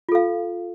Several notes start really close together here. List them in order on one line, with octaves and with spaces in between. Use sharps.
F4 A4 F5